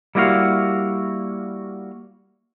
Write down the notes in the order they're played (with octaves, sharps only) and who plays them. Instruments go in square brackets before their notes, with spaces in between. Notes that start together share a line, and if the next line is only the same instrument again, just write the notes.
[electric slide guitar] G3 A#3 E4 F#4 B4 F5